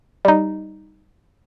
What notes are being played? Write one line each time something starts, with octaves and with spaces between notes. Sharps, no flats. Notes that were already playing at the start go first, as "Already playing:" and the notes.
G3 D#4